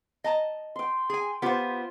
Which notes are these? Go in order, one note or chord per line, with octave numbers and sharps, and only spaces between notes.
D#5 A5 A#5
G5 C6
G#4 G#5
B3 F4 G4 C5